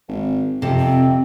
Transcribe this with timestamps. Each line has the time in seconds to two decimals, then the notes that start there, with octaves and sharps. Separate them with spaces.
0.09 G#1
0.62 F2 C3 C4
0.78 C4